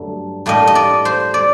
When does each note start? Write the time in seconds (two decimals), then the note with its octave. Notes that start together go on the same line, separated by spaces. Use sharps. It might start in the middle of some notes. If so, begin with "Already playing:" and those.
Already playing: G2 D3 F#3 A3
0.46 A2 G3 A#3 D#5
0.67 D#5
0.75 D5
1.05 C5
1.34 D5